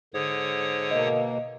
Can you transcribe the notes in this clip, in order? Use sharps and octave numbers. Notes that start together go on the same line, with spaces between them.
G#2 D3 C#5 D#6
B2 A#3 D#5